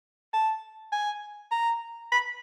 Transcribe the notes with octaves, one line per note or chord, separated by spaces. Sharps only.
A5
G#5
A#5
B5